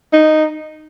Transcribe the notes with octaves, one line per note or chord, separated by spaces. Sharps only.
D#4